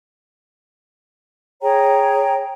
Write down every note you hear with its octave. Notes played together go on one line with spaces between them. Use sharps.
G#4 C#5 G5 A#5